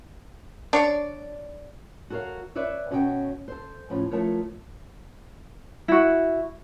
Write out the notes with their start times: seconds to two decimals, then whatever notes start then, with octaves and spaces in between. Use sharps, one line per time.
0.73 D4 C#5 D5
2.10 F#4 A4 A#4 C#5 F5
2.55 B4 C#5 D5 E5
2.91 B2 C#4 F#4 C#5 D5 G5
3.48 A4 C5
3.90 A2 F3 C#4
4.11 F3 A3 A#4 C#5
5.88 E4 F#4